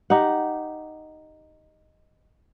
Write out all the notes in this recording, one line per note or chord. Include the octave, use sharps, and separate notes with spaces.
D#4 G4 F#5